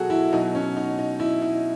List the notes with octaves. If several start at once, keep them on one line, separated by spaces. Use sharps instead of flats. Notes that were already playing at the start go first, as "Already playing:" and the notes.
Already playing: B2 F#3 F#4 G#4 A4
E4
B2 F#3 D#4
C#4
D#4
D#4
E4
D#4